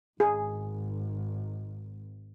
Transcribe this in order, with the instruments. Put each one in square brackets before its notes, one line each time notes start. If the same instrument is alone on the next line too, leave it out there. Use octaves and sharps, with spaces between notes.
[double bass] G#1 [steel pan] G#4